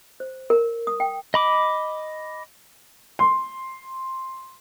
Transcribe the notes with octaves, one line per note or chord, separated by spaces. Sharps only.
C5
A#4
D#6
G5
D#5 B5 D6
C6